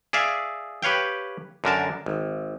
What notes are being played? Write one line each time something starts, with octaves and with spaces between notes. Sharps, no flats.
G#4 D5 E5 F5
G4 B4 C#5 F5 G5
F#2 D3 A#4 A5
G#1